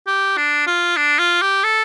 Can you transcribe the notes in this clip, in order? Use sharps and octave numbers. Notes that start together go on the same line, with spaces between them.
G4
D4
F4
D4
F4
G4
A4